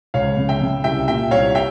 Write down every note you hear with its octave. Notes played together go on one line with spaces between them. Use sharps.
C#2 C#5 F5
C#3
E5 G5
C#3
C2 E5 G5
A#2 E5 G5
C2 C#5 F5
E5 G5